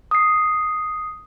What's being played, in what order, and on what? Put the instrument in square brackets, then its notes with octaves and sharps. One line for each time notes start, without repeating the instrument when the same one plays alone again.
[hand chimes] D#6 C7